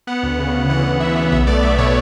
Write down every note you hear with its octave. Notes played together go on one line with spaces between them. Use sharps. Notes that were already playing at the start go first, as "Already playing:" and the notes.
B3 F#5
D2
C#3
C#3
E3 F#5
D2
E3 E5
B3
B1 E5
A3 D5
B1 E5
B2 C#5